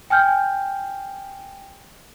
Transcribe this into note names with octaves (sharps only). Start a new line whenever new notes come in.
G5 G#5 F6 G6